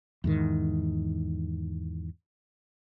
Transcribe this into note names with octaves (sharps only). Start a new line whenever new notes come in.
E2 G#2 D#3